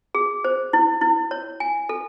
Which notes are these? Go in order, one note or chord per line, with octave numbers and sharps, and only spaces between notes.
G#4
C5
E4
E4
C#5
G#5
A4